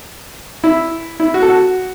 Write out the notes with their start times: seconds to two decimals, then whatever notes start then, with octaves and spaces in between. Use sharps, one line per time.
0.64 E4
1.20 E4
1.34 F#4
1.42 A4
1.48 F#4